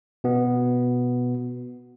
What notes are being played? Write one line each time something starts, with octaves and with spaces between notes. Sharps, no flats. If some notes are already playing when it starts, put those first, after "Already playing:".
B2 B3